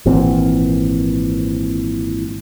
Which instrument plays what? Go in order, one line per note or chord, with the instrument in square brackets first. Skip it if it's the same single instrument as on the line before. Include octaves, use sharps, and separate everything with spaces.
[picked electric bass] G#1 A#2 E3 C4